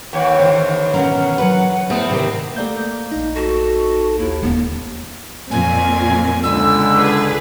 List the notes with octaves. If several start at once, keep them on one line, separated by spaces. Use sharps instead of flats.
D#2 B4 C#5 F#5 G5
D3 E3 D4 C5 C#5
B2 C#4 A#4 F#5
F#3 B4
E2 A3 C4 G#4 B4 D#6
C3 D#3 G4
A3 A#3 D5 G6
A#1 D#4
F#4 A4
D#2 E4
D#1 B3
F2 A#2 C4 G#5
C#2 D3 E6
G#4 B4